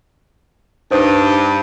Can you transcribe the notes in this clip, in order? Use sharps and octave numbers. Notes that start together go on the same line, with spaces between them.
G2 D#4 C5 D#6